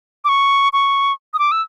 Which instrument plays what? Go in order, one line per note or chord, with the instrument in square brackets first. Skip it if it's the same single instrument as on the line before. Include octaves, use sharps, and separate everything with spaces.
[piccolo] D6
C#6
C#6
D#6
D6
E6